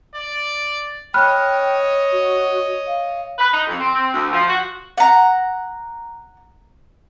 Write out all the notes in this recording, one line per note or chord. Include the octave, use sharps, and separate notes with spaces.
D5
C#5 D#5 G5 B5 F6 F#6
F#4
F5
B4
D#4
F2
C4
C4
D2
F3
F#4
F#5 A#5